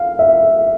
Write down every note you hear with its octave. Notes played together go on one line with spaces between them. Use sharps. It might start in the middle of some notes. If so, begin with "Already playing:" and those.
Already playing: F5
E5